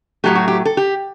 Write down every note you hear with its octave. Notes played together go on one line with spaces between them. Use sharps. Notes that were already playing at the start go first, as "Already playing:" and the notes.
A2 F#3 A3 G4
F#4
G4
A4
G4